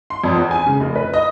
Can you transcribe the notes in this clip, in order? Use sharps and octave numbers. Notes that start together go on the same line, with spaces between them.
C6
F2
E2
G#5
C#3
F1
B4
D#5